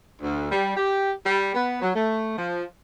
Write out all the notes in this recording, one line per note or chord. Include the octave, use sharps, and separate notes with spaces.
D2
G3
G4
G3
B3
F#3
A3
F3